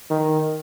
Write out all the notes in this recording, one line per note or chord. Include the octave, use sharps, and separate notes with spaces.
D#3